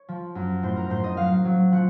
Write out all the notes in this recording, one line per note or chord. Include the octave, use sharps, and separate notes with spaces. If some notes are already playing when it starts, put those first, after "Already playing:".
Already playing: C#5
F3
F#2
A2 C5
A#4
A2 C5
D#5
F#3 F5
F#3
F3 F#5